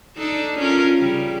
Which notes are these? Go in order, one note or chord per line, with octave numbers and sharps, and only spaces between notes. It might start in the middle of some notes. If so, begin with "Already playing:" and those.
D4 D#4 A4
C#4 F4 A#4
C#3 G3